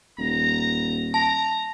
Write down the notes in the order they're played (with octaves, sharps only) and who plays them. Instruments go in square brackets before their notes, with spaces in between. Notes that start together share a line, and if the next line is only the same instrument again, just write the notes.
[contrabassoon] D#1 [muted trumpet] A#5
[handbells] A5 [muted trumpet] A#5